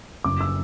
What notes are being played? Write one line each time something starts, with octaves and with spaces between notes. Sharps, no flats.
F#1 D6
E6